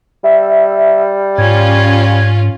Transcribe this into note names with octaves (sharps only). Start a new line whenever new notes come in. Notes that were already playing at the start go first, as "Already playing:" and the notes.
G3 E5
G#2 C#4 F4 G#6